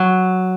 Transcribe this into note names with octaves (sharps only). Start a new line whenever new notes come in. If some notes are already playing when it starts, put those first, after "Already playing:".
Already playing: F#3